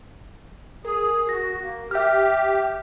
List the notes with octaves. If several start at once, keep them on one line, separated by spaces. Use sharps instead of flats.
G#4 A#4
F#4 A#6
A#3
G4 E5 F6